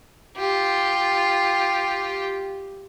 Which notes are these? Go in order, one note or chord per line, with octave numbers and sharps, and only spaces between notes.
F4 G4